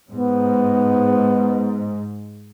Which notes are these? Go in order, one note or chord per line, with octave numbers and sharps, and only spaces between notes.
G#2 B3